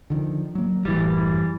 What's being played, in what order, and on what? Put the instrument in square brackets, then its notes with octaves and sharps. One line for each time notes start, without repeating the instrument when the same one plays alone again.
[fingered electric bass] D3 D#3 F3
F#3 A#3
[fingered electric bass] F#1 A2 [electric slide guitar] E3 G3